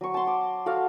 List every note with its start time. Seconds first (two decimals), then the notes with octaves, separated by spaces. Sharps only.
0.01 F#3 C#6
0.14 A5 C6
0.27 D6
0.66 F#4 A4 F5